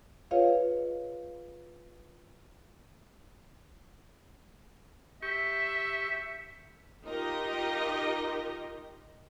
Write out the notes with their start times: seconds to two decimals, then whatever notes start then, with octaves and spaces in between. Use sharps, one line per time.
0.31 F4 G#4 B4 C#5 D#5 F5
5.22 G4 E5 C#6
7.05 D#4 F4 G4 A#4 D#5